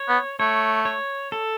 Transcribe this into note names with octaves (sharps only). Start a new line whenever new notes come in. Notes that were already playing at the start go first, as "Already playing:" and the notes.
Already playing: C#5
B3
A3 C#5
C#5
A4